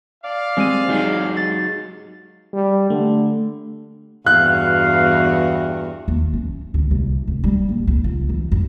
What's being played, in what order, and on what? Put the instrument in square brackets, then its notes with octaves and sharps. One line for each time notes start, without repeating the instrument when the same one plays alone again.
[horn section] D5 F5
[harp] G#3 G4 D#7 [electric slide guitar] C4
[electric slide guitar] F#3 D#4 G#4
[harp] A6
[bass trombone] G3
[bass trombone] D3 [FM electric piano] A3
[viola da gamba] E2 G2 F#4 [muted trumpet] F5 [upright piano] F#6
[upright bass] D#2
C#4
D2
C2
F1
G3
A#2
C2
C#2
E3
F#2